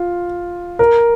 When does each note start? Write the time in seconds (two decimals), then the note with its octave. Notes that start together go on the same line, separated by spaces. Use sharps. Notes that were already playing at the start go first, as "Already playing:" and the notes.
Already playing: F4
0.79 A#4